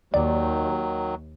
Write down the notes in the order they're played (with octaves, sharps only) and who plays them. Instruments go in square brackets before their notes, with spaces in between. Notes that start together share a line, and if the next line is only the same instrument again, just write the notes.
[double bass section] D#2 [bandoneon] D#3 F#3 [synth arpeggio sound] D5